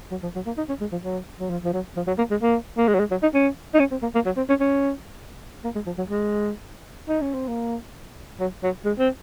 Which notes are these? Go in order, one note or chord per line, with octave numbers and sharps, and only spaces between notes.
F#3
F3
F#3
A#3
D#4
C#4
G#3
F3
F#3
F#3
F3
F3
F#3
F3
F#3
A#3
G#3
A#3
A#3
G#3
F#3
G#3
F#3
D#4
C#4
D#4
C#4
C4
A#3
A#3
F#3
C4
C#4
C#4
A#3
G#3
F3
F#3
G#3
D#4
C#4
C4
A#3
F#3
F#3
G#3
C4